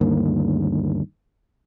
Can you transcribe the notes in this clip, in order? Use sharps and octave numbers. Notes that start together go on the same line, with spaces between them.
D2 G2 D#3 A#3